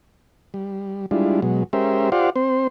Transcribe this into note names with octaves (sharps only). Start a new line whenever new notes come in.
G3
G3 G#3 D4 E4 F4
B2 F#3 G#3
G#3 C#4 G4 A#4 C5 E5
F4 G4 C5 D5 F5 F#5
C4 C5